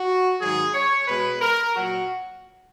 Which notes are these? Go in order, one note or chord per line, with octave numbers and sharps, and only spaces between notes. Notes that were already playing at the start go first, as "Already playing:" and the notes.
Already playing: F#4
G#2 D#3 F#3 G#4
C#5
B2 G#3 B4
A#4
A#2 F#3 F#4